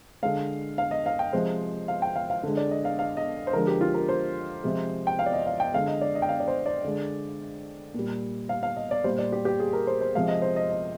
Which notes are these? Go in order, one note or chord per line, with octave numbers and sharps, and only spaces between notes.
D3 G#3 F5
F5
D#5
F5
G5
C3 F3 G#3 C5
F5
G5
F5
F5
D3 G#3
D5
D#5
F5
F5
D#5
C5
D3 F3 G#3 A#4
G4
F4
A#4
C5
C3 F3 G#3
G5
F5
D5
D#5
F5
G5
D3 G#3 F5
D#5
D5
D#5
G5
F5
D5
C5
D5
D3 G#3
A#2 G3
F5
F5
D#5
D5
A#2 G3 C5
D5
G4
G4
G#4
A#4
C5
C5
C3 F3 G#3 F5
D#5
C5
D#5
D#5